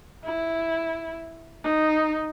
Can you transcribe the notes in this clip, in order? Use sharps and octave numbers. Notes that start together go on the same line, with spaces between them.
E4
D#4